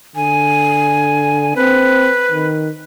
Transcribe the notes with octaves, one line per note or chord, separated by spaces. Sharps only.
D3 G#5
C4 B4
D#3